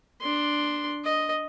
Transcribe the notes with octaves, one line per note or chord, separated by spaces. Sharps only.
D4 C6
D#5